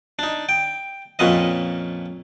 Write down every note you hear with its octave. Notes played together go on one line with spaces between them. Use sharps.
D4 D#4
G5
F2 A#2 C#4 B4 D#5